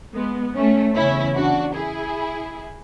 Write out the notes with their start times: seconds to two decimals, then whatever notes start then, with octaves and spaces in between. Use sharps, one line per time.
0.14 G#3 B3
0.54 A3 C#4
0.94 E2 C#3 E3 C#4 E4
1.36 D4 F#4
1.75 E4 G#4